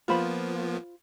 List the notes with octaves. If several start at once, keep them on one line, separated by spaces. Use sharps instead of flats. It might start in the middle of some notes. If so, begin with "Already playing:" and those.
F3 A#3 B3 F4 C5 B5